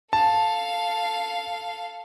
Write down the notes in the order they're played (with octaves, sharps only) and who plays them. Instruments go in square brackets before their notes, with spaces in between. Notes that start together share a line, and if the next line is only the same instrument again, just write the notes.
[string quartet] A4 F5 [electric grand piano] A5